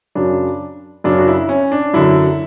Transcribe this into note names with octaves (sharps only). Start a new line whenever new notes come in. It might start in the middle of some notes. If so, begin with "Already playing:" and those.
F#2 C#3 F#3 D4
F#2 C#3 F#3 D4
F#4
E4
C#4
D4
F#2 D3 F#3 E4